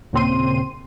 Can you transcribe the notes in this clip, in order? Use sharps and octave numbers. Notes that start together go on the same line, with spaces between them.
D#2 A#2 C#3 C4 C6 D#7